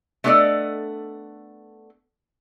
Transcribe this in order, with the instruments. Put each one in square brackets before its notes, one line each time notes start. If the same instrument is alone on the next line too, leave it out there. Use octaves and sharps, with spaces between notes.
[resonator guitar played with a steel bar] A3 B3 D4 A4 D5 D#5